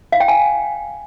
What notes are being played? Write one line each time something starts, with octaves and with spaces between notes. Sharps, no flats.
F5
G5
G#5